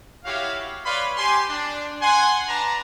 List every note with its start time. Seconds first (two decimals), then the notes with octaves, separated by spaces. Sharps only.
0.25 E4 F#4 G4 C#5 F5
0.86 B4 C#5 D5 F5 B5 C6
1.18 G4 G#5 C6
1.50 D4
2.02 F#5 G#5 C6
2.48 D4 B4 A5 A#5